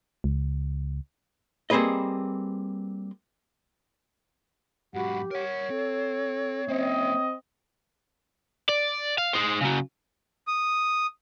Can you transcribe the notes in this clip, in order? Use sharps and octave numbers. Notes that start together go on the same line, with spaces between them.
C#2
G3 A#3 C4 G#4 B4 D#5
G#2 F#3 F#4 G4 F#5 B5
A#4 C#5 F#5
C4 A4
A#3 C4 C#4 D#5 E5
D5
F5
D#4 C5
C#3 F#3
D#6